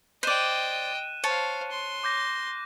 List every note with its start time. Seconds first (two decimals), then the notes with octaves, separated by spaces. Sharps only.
0.23 C5 D5 D#5 G5 F#6 D#7 E7
1.24 C5 C#5 F5 A5
1.71 C6
2.04 D6 G6 A#6